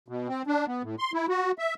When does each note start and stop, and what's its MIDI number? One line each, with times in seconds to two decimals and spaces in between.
0.08 0.28 47
0.28 0.42 60
0.47 0.66 62
0.67 0.82 59
0.83 0.96 45
0.99 1.12 84
1.13 1.26 64
1.29 1.52 66
1.58 1.74 76